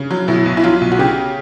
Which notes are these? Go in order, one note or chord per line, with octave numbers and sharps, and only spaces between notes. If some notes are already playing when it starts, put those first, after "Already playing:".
Already playing: C#3
F#3
B2 E4
B1
E4
F#3 F4
B1
F#4
C#3 G4